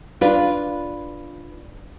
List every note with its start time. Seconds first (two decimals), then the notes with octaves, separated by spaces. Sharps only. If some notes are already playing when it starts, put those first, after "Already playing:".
0.21 D4 F4 B4